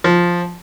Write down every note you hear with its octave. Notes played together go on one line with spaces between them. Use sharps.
F3